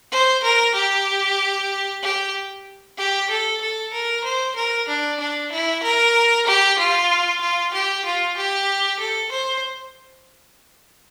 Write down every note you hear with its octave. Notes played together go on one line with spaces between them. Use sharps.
C5
A#4
G4
G4
G4
A4
A4
A#4
C5
A#4
D4
D4
E4
A#4
G4
F4
F4
G4
F4
G4
A4
C5